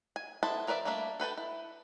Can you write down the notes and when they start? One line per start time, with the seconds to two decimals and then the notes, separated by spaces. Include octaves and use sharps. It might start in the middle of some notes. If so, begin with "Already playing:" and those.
0.16 G#5
0.43 B3 E4 A4 C5 A5
0.67 F3 A#4 B4 D5 E5
0.85 G3 A3 A#3 D4 E5
1.20 A4 B4 G5 A5
1.37 E4